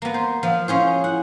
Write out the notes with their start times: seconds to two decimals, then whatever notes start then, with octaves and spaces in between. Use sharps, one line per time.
0.02 A#3 B3
0.14 C5
0.43 F3 F5 F#5 E6
0.68 C#4 E4 G#4 C5 F5
1.04 E4 F#5